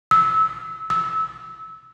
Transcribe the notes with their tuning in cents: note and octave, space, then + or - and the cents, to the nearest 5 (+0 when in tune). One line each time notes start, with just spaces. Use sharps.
E6 -20
E6 -20